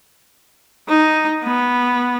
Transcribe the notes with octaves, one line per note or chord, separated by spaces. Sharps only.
D#4
B3